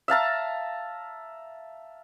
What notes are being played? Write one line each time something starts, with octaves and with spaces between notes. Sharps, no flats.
E5 F5 A5 A#5